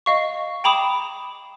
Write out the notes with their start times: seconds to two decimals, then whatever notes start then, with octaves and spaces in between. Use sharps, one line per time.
0.06 D#5 F5 C#6
0.64 G5 A#5 B5 D6 D#6 E7